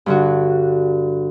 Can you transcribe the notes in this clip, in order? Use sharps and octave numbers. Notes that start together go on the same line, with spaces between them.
G2 D3 F#4